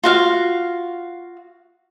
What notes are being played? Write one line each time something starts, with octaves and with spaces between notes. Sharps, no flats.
F4 F#4 F5